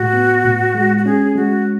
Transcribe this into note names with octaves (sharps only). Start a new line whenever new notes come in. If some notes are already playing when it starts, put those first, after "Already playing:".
Already playing: A2 F#4
B3
A2
G#3
F#4
C#4 G#4
G#3 F#4